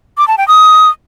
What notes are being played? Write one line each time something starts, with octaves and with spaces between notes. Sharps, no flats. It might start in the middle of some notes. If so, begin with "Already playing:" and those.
D6
A5
G5
D#6